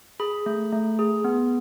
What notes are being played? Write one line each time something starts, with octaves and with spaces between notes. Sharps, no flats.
G#4 B5
A3
A3
G#4
B3